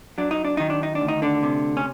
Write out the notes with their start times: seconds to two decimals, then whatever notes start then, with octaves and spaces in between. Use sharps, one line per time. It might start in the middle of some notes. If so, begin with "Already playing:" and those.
0.18 F#3 D4
0.31 D#4
0.45 D4
0.57 D#3 D#4
0.70 D4
0.83 D#4
0.95 D4
1.01 D2
1.08 D#4
1.22 D3 D4
1.43 C3
1.77 C#4